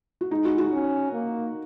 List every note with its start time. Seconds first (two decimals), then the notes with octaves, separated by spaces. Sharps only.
0.21 F#4
0.31 G#3 D#4
0.45 F#4
0.58 F#4
0.72 C#4
1.13 A#3